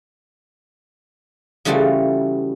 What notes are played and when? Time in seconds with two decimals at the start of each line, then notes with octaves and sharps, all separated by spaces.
1.65 C#3 E3 G3 A3 F4 F#4